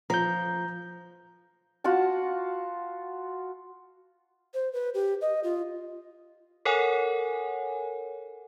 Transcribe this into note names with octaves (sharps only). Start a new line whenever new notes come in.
F3 A#5 G6
F4 F#4 F#5 A5
C5
B4
G4
D#5
F4
A4 A#4 C#5 F#5 G#5